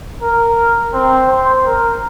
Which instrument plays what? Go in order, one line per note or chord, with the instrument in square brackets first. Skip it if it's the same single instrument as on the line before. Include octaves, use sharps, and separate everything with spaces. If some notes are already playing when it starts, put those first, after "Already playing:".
[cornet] A#4
C4
C5
A#4